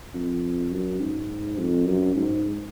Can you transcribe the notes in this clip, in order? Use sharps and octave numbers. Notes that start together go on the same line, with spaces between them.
F2
F#2
G#2
F2
F#2
G#2